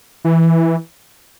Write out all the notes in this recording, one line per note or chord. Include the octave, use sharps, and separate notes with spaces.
E3